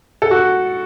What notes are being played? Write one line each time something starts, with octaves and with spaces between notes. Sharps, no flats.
A4
F#4